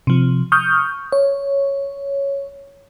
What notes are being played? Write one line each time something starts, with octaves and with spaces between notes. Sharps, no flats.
C3 F3
C#6 D#6 F6 G6
C#5